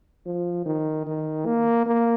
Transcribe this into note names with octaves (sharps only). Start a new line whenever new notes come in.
F3
D#3
D#3
A#3
A#3